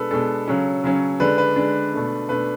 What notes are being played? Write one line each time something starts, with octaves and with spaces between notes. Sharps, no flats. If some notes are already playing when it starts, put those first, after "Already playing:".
Already playing: B2 G#3 D4 A4 B4
B2 G#3 D4 A4
C#3 F#3 C#4
C#3 F#3 C#4
D3 G#3 D4 B4
B4
D3 G#3 D4
B2 A3 D4
B2 A3 D4 B4